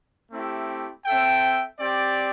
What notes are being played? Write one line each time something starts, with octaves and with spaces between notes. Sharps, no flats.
A3 C4 E4 G4
C4 A4 E5 G5
C4 G4 D5